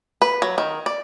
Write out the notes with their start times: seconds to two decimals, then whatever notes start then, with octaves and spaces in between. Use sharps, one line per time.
0.22 B4
0.42 F#3
0.58 D#3
0.86 D5